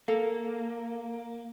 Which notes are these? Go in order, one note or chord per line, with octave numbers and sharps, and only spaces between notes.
A#3 A4 F5